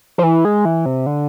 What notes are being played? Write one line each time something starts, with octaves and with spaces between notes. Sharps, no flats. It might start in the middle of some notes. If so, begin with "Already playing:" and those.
F3
E3
G#3
E3
C3
D3